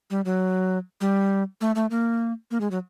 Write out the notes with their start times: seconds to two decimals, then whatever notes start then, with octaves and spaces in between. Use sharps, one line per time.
0.10 G3
0.25 F#3
1.01 G3
1.61 A3
1.76 A3
1.91 A#3
2.51 A#3
2.61 G#3
2.71 F#3